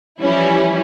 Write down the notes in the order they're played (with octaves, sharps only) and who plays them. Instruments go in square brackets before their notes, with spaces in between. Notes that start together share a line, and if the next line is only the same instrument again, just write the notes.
[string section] E3 F3 G3 C#4 E4